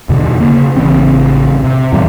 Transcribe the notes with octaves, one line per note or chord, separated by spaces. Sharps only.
E2 B2 D3
C#3 A#3
A1 C#3 E3 C4
C3
E2 A#2 E3 G3